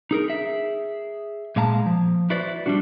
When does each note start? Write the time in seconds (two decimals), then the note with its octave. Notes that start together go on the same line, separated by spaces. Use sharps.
0.11 D#4 G#4 A#4
0.28 G#4 E5
1.56 A#2 G#3 F5 A5 A#5
1.86 F3
2.30 E4 F#4 B4 C5 D5
2.66 G3 D4 F#4